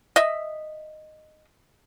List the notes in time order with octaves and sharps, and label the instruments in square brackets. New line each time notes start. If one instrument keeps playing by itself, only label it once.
[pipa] D#5 E5